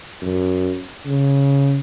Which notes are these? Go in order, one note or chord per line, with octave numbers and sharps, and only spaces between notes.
F#2
C#3